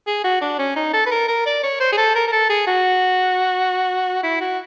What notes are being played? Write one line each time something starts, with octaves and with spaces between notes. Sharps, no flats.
G#4
F#4
D4
C#4
D#4
A4
B4
A#4
A#4
D5
C#5
C5
G#4
A4
A#4
A#4
A4
G#4
F#4
E4
F#4